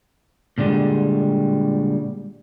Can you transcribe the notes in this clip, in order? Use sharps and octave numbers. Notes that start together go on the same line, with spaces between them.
A#2 D3 G3 G#3